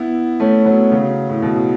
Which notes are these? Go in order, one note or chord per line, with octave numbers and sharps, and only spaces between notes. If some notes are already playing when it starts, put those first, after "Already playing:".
Already playing: B3 E4
A3 C#4
F#3 B3
C#3 F#3
A2
B2